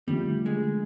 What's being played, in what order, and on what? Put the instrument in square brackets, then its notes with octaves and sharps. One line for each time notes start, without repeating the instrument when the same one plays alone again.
[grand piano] D3 F3 A3 [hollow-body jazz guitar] G3
[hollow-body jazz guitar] G#3